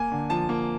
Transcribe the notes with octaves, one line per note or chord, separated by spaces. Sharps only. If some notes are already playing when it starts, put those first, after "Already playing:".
Already playing: A#3 G#5
D3
F3 A5
A#3